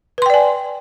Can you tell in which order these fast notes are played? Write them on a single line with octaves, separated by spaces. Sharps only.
B4 C6 G5 D5 G#5